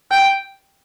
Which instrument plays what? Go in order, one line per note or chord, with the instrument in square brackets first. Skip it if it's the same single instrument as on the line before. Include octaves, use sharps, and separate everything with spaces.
[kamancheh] G5